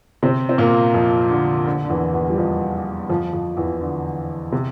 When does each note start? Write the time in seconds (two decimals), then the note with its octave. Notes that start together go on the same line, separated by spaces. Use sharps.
0.23 C3 C4
0.49 C4
0.58 A#2 A#3
0.94 F2 F3
1.30 D3
1.66 D3
1.85 D3
1.89 E2 E3
2.14 E2 E3
2.30 G3
2.38 F2 F3
3.09 F2 F3
3.33 F2 F3
3.57 E2 E3
3.81 D3
4.52 C3